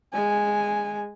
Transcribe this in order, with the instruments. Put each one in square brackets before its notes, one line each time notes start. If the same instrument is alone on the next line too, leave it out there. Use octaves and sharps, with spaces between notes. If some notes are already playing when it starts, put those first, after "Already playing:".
[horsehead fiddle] G#3 G#5